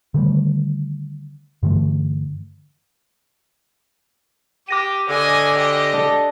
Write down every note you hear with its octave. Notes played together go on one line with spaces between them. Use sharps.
D3 D#3 G3 A3
G2 D3 E3 A3
G4 D6 A#6 D#7
D3 D#5 G#5
G4 D#5
D4 A4